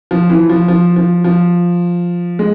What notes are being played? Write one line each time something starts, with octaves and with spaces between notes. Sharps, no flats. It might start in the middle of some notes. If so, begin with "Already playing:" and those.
F3
E3
F3
F3
F3
F3
G#3